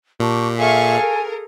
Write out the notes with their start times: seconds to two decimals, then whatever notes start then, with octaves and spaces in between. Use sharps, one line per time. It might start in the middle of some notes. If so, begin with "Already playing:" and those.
0.20 A#2 G4 A5 C#6
0.57 G#4 A4 E5 F5 G#5 C#6
0.97 A#4